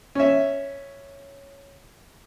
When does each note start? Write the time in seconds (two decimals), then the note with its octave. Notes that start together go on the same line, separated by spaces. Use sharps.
0.15 C#4 E5